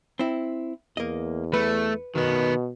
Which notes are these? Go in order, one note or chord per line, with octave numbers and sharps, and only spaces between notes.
C4 E4
E2 A#3 D#5
A3 B4
B2 D#3 B3